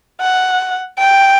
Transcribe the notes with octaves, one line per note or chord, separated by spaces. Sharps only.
F#5
G5